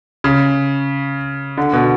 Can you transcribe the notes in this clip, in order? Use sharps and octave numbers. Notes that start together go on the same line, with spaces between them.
C#3
D3
B2